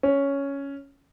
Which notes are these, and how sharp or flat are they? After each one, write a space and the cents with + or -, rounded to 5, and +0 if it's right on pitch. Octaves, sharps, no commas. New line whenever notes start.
C#4 +5